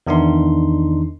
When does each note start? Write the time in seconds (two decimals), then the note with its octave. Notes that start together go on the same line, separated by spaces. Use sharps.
0.07 E2 D#3 D4 D#4 C6